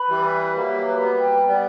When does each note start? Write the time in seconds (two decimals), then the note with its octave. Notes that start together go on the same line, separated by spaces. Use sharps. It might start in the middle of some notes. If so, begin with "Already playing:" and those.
Already playing: B4 B5
0.09 E3 G3
0.25 E5
0.55 F#3 A#3 G4
0.86 B4
1.01 G3 B3
1.17 G5
1.47 G3 B3 D5